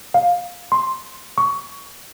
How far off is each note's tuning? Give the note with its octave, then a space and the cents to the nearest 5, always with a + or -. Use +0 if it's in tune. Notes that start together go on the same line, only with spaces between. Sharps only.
F5 +15
C6 +10
C#6 +20